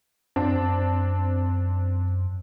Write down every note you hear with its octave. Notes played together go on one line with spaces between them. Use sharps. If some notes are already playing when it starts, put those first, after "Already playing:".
F#2 C4 D4